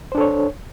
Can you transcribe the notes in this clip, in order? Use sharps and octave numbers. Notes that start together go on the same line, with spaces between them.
D4 A4 C5 C#5